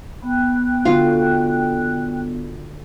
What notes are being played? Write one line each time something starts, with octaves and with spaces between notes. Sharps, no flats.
B3 G5 F#6
D3 F4 F#4